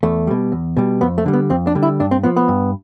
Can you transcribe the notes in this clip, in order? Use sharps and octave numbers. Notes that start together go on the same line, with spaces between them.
E2 A3
B2 G3
E2
B2 G3
F2 B3
A3
D3 G3
B3
F2 C4
D4
D3 G3
E4
G2 D4
C4
F3 B3
B3
G2